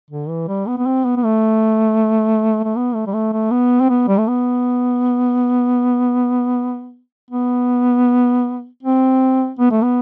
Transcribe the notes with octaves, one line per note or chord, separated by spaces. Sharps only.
D3
E3
G3
B3
B3
C4
B3
B3
A3
A3
B3
A3
G3
A3
A3
B3
C4
B3
G3
A3
B3
B3
C4
B3
A3
B3